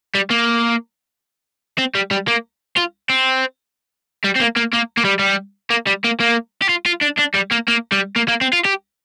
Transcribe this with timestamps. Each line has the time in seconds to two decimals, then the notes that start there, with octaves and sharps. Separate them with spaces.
0.15 G3
0.31 A#3
1.78 C4
1.95 G3
2.11 G3
2.28 A#3
2.77 F4
3.09 C4
4.24 G3
4.35 C4
4.40 A#3
4.56 A#3
4.73 A#3
4.97 A#3
5.05 G3
5.19 G3
5.70 A#3
5.87 G3
6.04 A#3
6.20 A#3
6.62 G4
6.69 F4
6.86 F4
7.01 D4
7.17 D4
7.34 G3
7.51 A#3
7.68 A#3
7.92 G3
8.16 A#3
8.28 A#3
8.41 C4
8.53 F4
8.65 G4